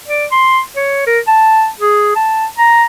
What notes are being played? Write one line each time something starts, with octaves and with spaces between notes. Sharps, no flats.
D5
C6
C#5
A#4
A5
G#4
A5
A#5